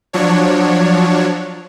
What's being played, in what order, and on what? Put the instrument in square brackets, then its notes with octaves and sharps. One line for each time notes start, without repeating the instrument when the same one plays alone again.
[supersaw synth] F3 F#3 D4 C#5